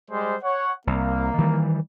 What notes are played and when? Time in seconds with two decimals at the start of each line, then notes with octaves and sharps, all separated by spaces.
0.10 G3 G#3 C5
0.44 C#5 F#5
0.87 C2 A#3
1.38 D#3 E3 G3